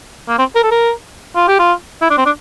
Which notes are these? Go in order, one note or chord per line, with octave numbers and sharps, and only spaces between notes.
A#3
C4
A#4
A4
A#4
F4
G4
F4
E4
D4
C4
D4